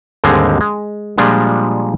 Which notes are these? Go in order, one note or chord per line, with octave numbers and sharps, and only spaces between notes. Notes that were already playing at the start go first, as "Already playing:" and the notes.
D#2 G#2 D3 G3 G#3 C4
G#3
A#2 F3 G3 G#3 D4